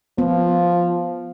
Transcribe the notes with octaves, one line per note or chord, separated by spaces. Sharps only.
F3 B3